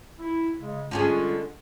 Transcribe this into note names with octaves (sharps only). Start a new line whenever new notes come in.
E4
C#3 G#3
D3 G3 G#3 C#4 F4 G#4